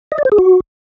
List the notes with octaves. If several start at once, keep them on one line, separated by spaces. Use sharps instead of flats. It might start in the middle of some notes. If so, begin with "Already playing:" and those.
D#5
D5
C5
G#4
F#4